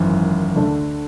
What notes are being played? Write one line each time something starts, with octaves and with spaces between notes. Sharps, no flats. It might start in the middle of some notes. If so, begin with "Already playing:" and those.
Already playing: G#1 F#2 E3
D2 D3 A3 D4